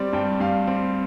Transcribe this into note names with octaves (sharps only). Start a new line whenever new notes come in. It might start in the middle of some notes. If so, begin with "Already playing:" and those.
Already playing: G3 C4 D5
G2 G5
G2 F5
C4